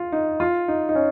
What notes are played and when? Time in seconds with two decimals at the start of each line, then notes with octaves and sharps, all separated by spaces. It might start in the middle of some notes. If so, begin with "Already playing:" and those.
Already playing: F4
0.12 D#4
0.40 F4
0.68 D#4
0.89 D#4
0.95 C#4